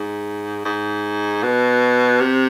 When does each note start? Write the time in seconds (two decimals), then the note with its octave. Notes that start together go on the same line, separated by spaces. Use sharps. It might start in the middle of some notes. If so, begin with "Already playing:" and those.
Already playing: G#2
0.65 G#2
1.43 B2
2.20 C3